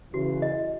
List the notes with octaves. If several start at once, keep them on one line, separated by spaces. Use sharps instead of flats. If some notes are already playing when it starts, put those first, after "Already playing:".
C#3 E3 F#4
D#5